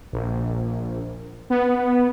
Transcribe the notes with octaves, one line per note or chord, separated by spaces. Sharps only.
A#1
B3